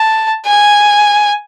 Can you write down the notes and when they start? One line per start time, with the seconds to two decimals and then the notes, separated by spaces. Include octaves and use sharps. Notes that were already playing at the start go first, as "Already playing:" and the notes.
Already playing: A5
0.46 G#5